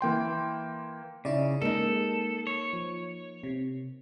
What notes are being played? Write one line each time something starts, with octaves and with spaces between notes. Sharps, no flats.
E3 A#3 G5 C6
C#3 D#4 E4 D5
G#3 A#3 D#4 A4
C#5
F3
C3